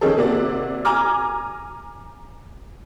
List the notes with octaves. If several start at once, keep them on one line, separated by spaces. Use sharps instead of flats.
D#3 G#3 C#4 G#4 A4
C3 A#3 F#4 D5
G#5 A#5 D6 F6